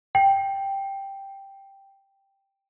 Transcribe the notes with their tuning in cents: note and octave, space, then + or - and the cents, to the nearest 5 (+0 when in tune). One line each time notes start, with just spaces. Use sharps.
G5 +0